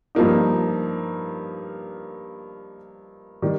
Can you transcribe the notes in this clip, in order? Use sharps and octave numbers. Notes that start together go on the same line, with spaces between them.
G2 F3 A#3 D#4
D#3 G3